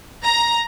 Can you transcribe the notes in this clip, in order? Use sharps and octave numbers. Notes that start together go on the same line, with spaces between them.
A#5